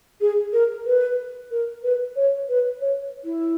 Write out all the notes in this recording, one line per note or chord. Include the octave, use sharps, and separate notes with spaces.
G#4
A#4
B4
A#4
B4
C#5
B4
C#5
E4